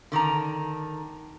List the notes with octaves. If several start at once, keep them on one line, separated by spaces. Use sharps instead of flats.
D3 D#3 A5 A#5